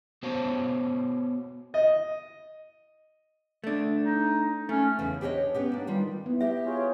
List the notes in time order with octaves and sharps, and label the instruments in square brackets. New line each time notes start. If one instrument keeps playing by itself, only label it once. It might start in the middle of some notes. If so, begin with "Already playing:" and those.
[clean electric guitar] B3 F#4 C5 C#5 F5 A5
[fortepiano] D#5
[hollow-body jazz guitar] A3 D4
[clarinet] D#4
[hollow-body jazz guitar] A3 [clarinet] C#4
[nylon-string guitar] E2 C#3
D4 G4 G#4 A#4 C#5 D#5
B3 C#4 G4
A#3 D4
D#3 G3 F4
[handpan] B3 E4
[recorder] G4 [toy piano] E5
[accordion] F4 G#4 C#5